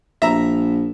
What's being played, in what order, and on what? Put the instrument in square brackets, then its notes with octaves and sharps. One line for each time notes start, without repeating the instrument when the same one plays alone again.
[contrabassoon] A#1 [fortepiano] E5 A#5